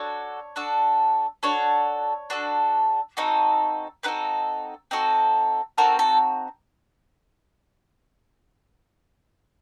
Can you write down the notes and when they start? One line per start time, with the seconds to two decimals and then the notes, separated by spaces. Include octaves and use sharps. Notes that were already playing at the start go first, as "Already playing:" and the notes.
Already playing: D4 F#4 A4 C#5
0.56 D4 F#4 A4
1.43 D4 F#4 A4 C#5
2.30 D4 F#4 A4
3.17 C4 D#4 F#4 A4
4.03 C4 D#4 F#4 A4 B4
4.91 C4 D#4 F#4 A4
5.78 C4 D#4 F#4 A4 A#4
5.99 A4